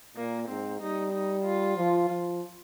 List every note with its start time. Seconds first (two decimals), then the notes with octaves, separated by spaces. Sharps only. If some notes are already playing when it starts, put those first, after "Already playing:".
0.17 A#2 A#3
0.48 G#2 C4
0.80 G3 D#4
1.13 D#4
1.44 F4
1.76 F3
2.09 F3